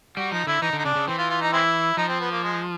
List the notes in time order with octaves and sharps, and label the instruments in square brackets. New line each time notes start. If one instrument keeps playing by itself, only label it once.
[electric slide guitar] G3 [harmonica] F#4
[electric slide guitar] F3 [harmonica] D#4
[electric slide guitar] D3 [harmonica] E4
[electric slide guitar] E3 [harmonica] D#4
[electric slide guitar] D3
[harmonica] D#4
[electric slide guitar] C#3 [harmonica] D4
[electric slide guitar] C#3
[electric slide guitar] E3 [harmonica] C4
[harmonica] F4
F4
D#4
G#3 C4 E4
[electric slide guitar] F3 [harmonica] D#4
[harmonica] C4
B3
A#3
G#3